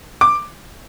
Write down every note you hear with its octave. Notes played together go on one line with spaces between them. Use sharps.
D6